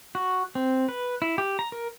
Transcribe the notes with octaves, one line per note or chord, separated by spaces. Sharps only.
F#4
C4
B4
E4
G4
A#5
A#4